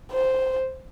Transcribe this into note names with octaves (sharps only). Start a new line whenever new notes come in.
C5